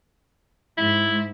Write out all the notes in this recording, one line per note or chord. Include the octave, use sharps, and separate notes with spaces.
G#2 E4